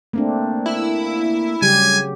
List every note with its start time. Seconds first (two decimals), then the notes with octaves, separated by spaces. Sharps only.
0.13 A3 A#3 C4 D4
0.66 E4
1.62 C#3 F#3 G3 G4 G#5